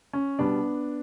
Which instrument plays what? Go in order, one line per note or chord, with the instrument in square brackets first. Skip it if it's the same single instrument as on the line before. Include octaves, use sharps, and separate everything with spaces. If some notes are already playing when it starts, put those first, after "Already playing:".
[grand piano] C#4
B2 G3 B3 D4